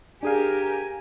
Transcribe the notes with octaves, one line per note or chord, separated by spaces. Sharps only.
D4 G4 G#4 A#4 F5 G#5